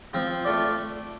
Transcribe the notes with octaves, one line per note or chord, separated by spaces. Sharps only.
F3 C4 F4
A3 F4 A4 D5